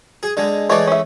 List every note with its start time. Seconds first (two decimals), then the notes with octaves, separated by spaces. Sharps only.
0.23 G#4
0.37 D3 G#3
0.70 E3 G#3 A3 C#5 D5
0.87 C#4 E5